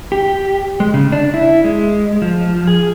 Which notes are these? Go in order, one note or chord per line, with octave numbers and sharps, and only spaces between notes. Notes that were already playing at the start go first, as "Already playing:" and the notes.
G4
G#3
C#3
D4
E4
G#3
F3
G#4